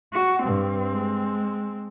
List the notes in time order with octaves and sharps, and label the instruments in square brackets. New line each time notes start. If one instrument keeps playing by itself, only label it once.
[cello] F#4
[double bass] G2 [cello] C4
[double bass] G#3